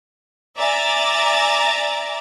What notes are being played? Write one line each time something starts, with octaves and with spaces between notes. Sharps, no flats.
D5 E5 G#5 A#5 A6